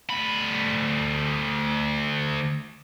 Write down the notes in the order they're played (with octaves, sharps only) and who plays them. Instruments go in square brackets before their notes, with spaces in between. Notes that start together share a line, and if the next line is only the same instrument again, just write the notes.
[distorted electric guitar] D2 B5